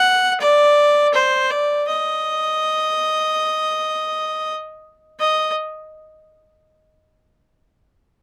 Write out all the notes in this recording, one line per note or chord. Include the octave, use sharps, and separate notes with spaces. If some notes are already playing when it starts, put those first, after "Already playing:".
Already playing: F#5
D5
C5
D5
D#5
D#5